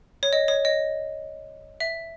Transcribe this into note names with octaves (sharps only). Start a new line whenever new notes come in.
C#5
D#5
C#5
D#5
E5